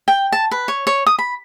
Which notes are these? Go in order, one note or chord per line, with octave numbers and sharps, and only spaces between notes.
G5
A5
B4
C#5
C#5
D#6
B5